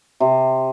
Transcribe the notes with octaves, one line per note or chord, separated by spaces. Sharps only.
C3